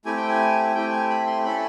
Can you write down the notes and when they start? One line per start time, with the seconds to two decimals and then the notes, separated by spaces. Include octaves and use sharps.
0.05 A3 C4 E4 G4 G#5
0.17 G5
0.29 G#5
0.64 G#5
0.74 A3 C4 E4 G4 G5
0.92 G#5
1.10 B5
1.27 C6
1.44 C#4 E4 A4 B5